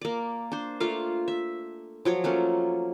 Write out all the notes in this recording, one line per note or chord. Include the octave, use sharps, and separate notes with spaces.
A#3 D5
D4 C5
A3 A#3 F4 F5
E5
F3 F#3 C#5
A3 A#3 C#4